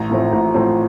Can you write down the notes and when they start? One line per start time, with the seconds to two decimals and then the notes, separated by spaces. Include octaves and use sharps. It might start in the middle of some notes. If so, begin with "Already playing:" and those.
Already playing: A1 A#5
0.10 A2 F3 A3 C4
0.33 A1
0.54 A2 F3 A3 C4